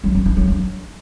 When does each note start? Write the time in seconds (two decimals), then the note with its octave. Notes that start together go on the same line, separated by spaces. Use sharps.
0.04 F#3
0.15 D4
0.26 D4
0.37 F#3
0.48 D4